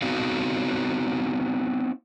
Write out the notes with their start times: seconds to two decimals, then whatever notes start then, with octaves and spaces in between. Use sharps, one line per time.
0.02 B3 C4 D#4 F#4 F5